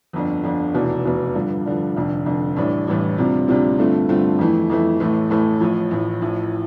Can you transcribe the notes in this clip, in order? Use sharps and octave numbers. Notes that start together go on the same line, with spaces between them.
G1 F2 D3
G1 F2 D3
F1 E2 B2
F1 E2 B2
G2 D3 F3
G2 D3 F3
F1 F2 D3
F1 F2 D3
A1 A2 E3 G3 D4
A1 A2 E3 G3 D4
D2 C3 G3 C4 F4
D2 C3 G3 C4 F4
G2 D3 A3 C4 F4
G2 D3 A3 C4 F4
F2 E3 A3 E4
F2 E3 A3 E4
A1 A2 E3 A3
A1 A2 E3 A3
A1 A2 F3
A1 A2 F3
A1 A2 F3